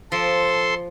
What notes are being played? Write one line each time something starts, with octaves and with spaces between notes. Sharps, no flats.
F3 A4 C6